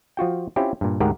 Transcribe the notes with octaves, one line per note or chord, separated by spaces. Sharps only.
F3 F4 F#4 G5
C4 C#4 E4 F4 G4
G2 A#2
D2 G#2 G4 G#4 A#4 F#5